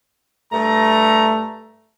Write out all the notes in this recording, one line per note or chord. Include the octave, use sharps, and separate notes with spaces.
G2 A3 A#5